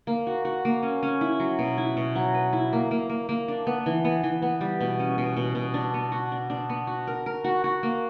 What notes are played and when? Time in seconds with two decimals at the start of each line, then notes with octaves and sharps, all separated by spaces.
0.07 A#3
0.27 F#4
0.45 F#4
0.65 A#3
0.83 C#4
1.03 C#4
1.21 E4
1.40 F#3
1.59 B2
1.78 E4
1.97 B2
2.15 F#3
2.34 B4
2.53 E4
2.73 A#3
2.91 A#3
3.09 A#3
3.29 A#3
3.48 D4
3.67 B3
3.86 E3
4.05 B3
4.23 E3
4.42 B3
4.61 G3
4.81 B2
4.99 C#4
5.18 B2
5.37 B2
5.55 B2
5.74 D4
5.94 B3
6.12 F#4
6.32 D4
6.50 D4
6.70 B3
6.87 F#4
7.07 A#4
7.26 A#4
7.44 F#4
7.64 F#4
7.83 A#3